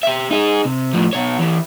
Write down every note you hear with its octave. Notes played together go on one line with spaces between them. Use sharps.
G4 E5
D#4 G#4
C3
A2 F3
B2 C#5
E3 G4